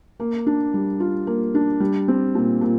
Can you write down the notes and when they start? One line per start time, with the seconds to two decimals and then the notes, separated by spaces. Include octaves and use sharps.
0.20 A#3
0.46 D4
0.74 G3
1.00 F4
1.27 A#3
1.55 D4
1.80 G3
2.08 C4
2.35 A#2
2.61 A#2